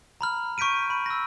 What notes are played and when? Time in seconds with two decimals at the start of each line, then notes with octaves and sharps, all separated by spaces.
0.21 A#5 B5 F6
0.58 C#6 G6 B6 D7 D#7
0.90 B5
1.06 E6 A#6